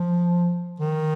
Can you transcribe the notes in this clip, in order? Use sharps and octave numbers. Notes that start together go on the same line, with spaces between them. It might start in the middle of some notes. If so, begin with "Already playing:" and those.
Already playing: F3
D#3